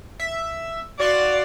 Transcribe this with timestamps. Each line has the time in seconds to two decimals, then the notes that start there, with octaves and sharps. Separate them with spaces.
0.20 E5
1.00 F#4 D5 F5 C6